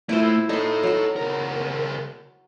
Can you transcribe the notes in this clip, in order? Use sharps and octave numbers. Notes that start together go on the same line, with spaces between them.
A2 A3 E4 F4 C5
D#4 A4 C#5 C6
F#3 F#4
C#2 A#4